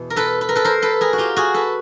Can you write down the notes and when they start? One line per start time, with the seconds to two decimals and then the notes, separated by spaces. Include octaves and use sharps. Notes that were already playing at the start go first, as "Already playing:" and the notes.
Already playing: E2 B2
0.10 A#4
0.16 A4 B4
0.41 B4
0.49 A#4
0.56 A4 B4
0.64 A#4 C5
0.82 A4 B4
1.01 G#4 A#4
1.13 F#4
1.18 F4 G4
1.36 F#4 G#4
1.54 A4 B4